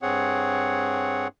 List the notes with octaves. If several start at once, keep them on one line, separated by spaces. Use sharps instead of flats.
G2 C4 G#4 C#5 F#5